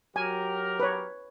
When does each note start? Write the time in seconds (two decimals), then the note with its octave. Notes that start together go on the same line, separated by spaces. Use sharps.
0.16 F#3 G4 A#4 G#5
0.80 B4 C#5